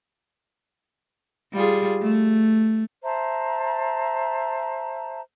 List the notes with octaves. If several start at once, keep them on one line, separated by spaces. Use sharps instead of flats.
G3 F4 G#4
A3
C5 E5 A5 A#5